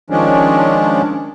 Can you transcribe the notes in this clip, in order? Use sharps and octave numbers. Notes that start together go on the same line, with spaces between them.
D#3 F3 G#3 C#4 D4